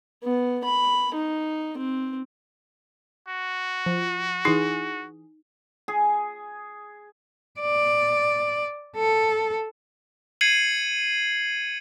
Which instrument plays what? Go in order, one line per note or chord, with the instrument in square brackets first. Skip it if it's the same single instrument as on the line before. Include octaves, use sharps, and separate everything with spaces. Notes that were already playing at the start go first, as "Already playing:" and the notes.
[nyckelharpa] B3
B5
D#4
C4
[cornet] F#4
[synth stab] F3
[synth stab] E3 G#4 [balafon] D#4
[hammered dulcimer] G#4
[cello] D5
A4
[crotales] G#6 C7 C#7 D#7 F#7